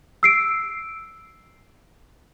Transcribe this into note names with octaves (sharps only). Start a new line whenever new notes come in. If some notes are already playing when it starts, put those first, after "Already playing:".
E6 C7 D7